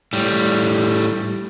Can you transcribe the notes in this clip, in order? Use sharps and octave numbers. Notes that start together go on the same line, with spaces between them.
A2 G3